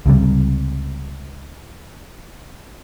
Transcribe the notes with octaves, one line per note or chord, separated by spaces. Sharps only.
C#2 C3 G3